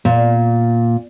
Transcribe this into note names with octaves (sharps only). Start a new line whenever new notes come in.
A#2